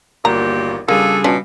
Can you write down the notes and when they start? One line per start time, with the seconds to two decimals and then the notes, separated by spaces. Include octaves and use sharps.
0.25 G1 D#2 A#2 A#3 F#4 G4 A#5
0.88 C#3 G3 A#3 D4 F4 G#4 A4
1.24 B2 C#4 D4 F4